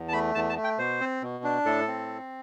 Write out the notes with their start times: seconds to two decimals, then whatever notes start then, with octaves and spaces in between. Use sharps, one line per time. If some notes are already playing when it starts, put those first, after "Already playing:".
Already playing: E2
0.08 A5
0.13 A3 B5
0.35 E2 A5
0.50 A5
0.57 A3
0.64 G5
0.78 B2 C5
1.00 C4
1.22 B2
1.44 D4
1.65 A2 A4
1.87 C4